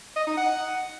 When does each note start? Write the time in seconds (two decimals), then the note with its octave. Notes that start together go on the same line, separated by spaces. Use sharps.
0.16 D#5
0.27 D#4
0.37 F#5